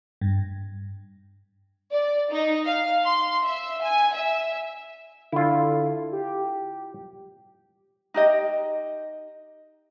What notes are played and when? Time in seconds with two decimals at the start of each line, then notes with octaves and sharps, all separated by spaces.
0.21 G2
1.93 D5
2.32 D#4
2.66 F5
3.04 C6
3.45 E5
3.83 G#5
4.16 E5
5.32 D3 E4 F4
6.13 G4
8.14 D#4 G4 D#5